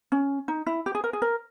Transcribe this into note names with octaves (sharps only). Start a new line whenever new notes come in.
C#4
D#4
E4
G4
G#4
A#4
G#4
A#4